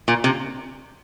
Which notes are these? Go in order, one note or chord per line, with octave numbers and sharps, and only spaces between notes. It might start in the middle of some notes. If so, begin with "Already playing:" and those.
A#2
C3